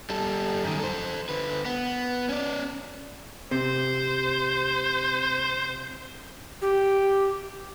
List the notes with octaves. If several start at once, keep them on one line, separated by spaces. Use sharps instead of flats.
G3 A4
F#2 D#3
A4 C5
D3 B4
B3
C#4 D5
C3 C5
G4